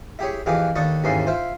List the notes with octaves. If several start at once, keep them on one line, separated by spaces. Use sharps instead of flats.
E4 G4 G#4 C#5
F2 E3 F4 G4 G#4 D6
D#2 D4 A4 A5 C#6 D#6
D#2 G#2 E3 C#4 A4 C6
E4 F4 C5